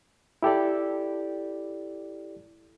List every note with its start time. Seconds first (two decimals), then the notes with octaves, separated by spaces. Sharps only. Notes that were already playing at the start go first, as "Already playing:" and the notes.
0.43 E4 G4 A4 D5